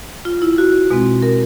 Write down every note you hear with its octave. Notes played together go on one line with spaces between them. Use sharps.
F4
E4
F#4
B2 G#3 C4
A#4